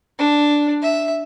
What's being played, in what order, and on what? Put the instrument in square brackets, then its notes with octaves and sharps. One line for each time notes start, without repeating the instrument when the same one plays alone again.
[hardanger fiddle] D4
E5